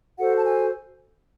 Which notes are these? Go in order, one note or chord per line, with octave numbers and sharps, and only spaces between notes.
F#4 A4 C5 F#5
A5
G#5